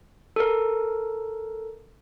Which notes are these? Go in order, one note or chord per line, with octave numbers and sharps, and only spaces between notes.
A4 A#4